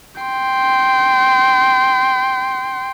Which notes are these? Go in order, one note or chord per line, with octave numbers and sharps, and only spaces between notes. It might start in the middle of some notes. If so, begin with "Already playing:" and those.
G5 C6